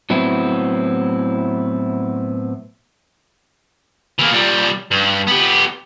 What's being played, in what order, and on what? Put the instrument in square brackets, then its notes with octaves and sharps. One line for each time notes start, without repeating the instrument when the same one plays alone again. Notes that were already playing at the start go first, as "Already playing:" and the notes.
[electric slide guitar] A2 F#3 B3 C4 E4
[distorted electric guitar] E3 A#3
A#2 G3
G2
B3 G4